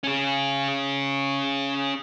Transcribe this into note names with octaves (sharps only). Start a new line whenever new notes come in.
C#4 G#4